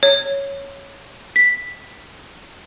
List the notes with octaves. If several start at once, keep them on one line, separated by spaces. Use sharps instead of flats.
C#5
B6